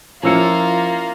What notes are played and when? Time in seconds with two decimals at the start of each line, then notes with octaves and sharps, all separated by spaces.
0.23 F3 A#3 C#4 E4 F4 E6 C#7